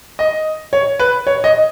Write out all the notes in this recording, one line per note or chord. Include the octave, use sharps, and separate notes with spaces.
D#5
C#5
B4
C#5
D#5